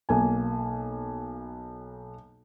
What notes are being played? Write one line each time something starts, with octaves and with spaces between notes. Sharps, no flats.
B1 A#3 G#5